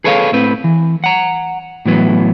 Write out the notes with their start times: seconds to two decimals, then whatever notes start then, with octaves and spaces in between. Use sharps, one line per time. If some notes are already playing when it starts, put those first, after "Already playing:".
0.04 G#4 A4 B4 C#5 D#5 F5
0.33 A2 C4 B4
0.64 E3
1.04 F#5 A#5
1.86 A2 E3 F#3 B3